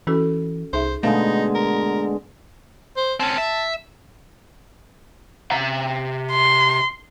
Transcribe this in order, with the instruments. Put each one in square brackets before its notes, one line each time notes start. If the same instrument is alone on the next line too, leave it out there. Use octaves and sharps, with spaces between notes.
[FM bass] E3 [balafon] C#4 F#4 A4
[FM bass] C2 [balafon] D#4 G#4 E5 [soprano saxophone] C5
[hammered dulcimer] B2 D3 G#3 [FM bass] A3 [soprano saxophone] D#4 [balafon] F5
[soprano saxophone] A#4
C5
[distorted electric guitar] C4 C#4 [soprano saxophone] A5
[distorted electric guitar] E5
[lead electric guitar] C3 A#5
[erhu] C6